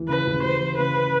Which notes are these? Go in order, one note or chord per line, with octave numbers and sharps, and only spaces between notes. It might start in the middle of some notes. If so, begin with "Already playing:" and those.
Already playing: D#2 E3
C#3 B4
D#2
D#2 C5
E3
C#3 B4